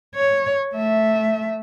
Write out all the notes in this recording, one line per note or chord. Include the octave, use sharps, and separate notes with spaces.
C#5
A3 E5